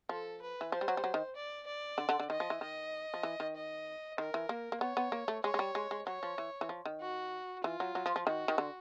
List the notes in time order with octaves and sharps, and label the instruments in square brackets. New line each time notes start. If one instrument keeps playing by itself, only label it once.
[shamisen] F3 [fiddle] A4
[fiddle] B4
[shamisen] E3
[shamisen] F3 [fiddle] C5
[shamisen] G3
F#3
G3
F#3
D#3
[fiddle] D5
D5
[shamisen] D3
D3
D3
[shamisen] D#3 [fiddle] D#5
[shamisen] F3
E3
[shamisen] D#3 [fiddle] D#5
[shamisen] F3
E3
D#3
[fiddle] D#5
[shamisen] D#3 [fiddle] A#4
[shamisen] E3
A#3
A#3
[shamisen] B3 [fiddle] C#5
[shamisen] B3
A#3
A3
[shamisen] G#3 [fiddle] C#5
[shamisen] G#3
G3
G#3
G#3
[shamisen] F#3 [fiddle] C#5
[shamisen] F3
E3
E3
F3
D#3
[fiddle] F#4
[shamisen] E3 [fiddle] F4
[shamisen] F#3
F#3
F3
F3
[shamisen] D#3 [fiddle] F#4
[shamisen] D#3
D3